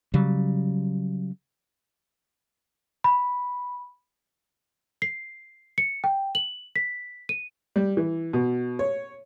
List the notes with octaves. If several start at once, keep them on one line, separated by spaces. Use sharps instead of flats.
C#3 F#3 G3
B5
C7
C#7
G5
F#7
B6
D#7
G3
E3
B2
C#5